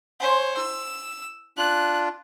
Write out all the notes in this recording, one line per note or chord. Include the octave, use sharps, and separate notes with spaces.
C5 C#5 F#5 G#5 C6
E4 E6
D4 F4 F#6